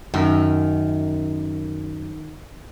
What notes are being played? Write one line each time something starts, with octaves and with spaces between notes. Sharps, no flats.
F#2 D#3